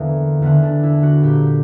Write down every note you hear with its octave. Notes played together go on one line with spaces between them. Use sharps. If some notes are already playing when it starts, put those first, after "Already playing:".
Already playing: E2 D3 A#3
E2 D3 B3
D4
E4
F#4
A#2 G4